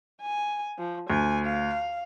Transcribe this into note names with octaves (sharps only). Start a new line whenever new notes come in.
G#5
F3
D2 G#5
F5